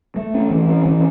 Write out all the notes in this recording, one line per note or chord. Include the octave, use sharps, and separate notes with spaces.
A3
C#4
E3
C#4
E3